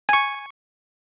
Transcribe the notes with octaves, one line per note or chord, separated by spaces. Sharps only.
G#5 C#6